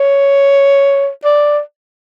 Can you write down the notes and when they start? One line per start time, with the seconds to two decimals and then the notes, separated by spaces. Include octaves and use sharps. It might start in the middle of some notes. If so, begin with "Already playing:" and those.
Already playing: C#5
1.24 D5